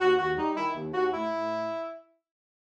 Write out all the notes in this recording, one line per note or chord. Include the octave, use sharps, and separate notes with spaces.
D#2 F#4
D#2 F#4
G3 D#4
D#3 E4
D#2
D#2 F#4
A2 E4
A2